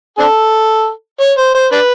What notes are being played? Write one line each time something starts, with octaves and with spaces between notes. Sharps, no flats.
C4 D4 A4
C#5
C5
C5
D4 B4